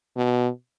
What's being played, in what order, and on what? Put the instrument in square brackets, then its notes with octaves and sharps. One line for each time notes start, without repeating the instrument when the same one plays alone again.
[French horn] B2